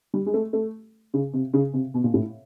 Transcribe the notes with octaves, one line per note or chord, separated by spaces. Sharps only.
G3
G#3
A3
A3
C#3
C3
C#3
C3
B2
A#2
A2